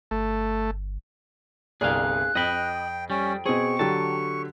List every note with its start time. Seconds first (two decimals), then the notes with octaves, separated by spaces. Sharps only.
0.11 G1 A3
1.81 G1 C2 G#4 D5 F5 F#6
2.35 F2 D#5 G5 B5
3.10 G3 C#4 G5
3.46 B2 C4 G#4 C#6
3.79 D3 F#3 G4 A5